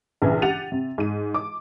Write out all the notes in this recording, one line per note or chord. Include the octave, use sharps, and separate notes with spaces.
A#1 C#3 E3
G4 F#5 A6 D#7 F7
C3
G#2 D#7
D6